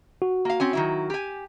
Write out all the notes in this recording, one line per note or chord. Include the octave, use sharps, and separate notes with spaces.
F#4
A#3 F5
C4 C#4 G#5
D#3 F#3 E4
G4 G#5